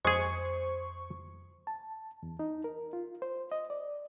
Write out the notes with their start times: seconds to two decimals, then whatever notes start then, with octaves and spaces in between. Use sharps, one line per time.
0.05 F2 G#3 G#4 C5 C#6
1.67 A5
2.23 E2
2.39 D#4
2.64 A#4
2.93 F4
3.22 C5
3.52 D#5
3.70 D5